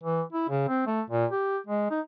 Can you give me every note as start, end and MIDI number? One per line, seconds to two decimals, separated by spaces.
0.03 0.22 52
0.32 0.46 64
0.49 0.64 49
0.68 0.86 60
0.86 1.02 57
1.10 1.26 46
1.31 1.58 67
1.67 1.87 56
1.90 2.00 63